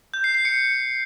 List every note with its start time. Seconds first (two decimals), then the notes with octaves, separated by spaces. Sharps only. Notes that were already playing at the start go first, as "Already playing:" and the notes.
0.14 G6
0.24 C7
0.35 C7
0.45 C#7